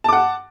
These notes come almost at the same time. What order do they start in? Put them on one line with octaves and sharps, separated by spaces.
A5 D6 F#5